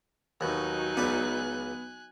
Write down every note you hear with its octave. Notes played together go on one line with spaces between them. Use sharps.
D#2 B2 F#3 D#4 G#5 F#6
C#2 B3 B4 D5